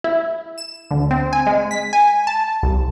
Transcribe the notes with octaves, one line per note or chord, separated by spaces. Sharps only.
E4
E7
D2
C4
G#5
G#3
B6
G#5
A5
C2